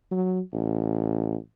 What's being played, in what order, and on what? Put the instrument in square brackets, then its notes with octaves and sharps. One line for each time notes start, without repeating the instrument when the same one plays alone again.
[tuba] F#3
A1